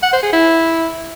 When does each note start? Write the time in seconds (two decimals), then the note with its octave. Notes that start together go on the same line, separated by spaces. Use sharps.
0.03 F#5
0.13 C5
0.23 G#4
0.33 E4